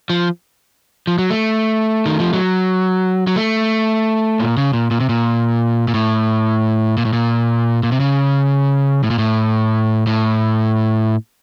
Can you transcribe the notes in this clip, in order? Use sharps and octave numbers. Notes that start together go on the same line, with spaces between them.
F3
F3
F#3
A3
D#3
F3
F#3
F#3
A3
A#2
C#3
A#2
A#2
C3
A#2
A#2
A2
A#2
A2
A#2
A#2
C3
C#3
A2
A#2
A2
A2